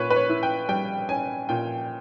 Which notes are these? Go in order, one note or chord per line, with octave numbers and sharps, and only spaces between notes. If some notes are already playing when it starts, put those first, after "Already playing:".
Already playing: A#2 C#4 B4 C#5
B4
C#5
E4
G5
G3 G5
C#4 G#5
A#2 G5